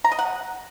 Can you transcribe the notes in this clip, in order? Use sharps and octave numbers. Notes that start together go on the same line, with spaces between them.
A#5
D#5
F#5